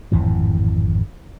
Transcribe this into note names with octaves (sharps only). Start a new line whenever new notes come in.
G#1 F2 A2 E3